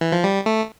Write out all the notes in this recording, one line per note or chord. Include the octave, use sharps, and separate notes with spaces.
E3
F3
G3
A3